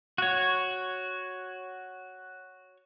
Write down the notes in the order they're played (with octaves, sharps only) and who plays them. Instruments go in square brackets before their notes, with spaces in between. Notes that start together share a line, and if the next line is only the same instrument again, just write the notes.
[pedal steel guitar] F#4 C#5